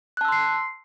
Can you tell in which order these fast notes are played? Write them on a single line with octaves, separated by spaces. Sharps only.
F#6 A5 E6 C6 C7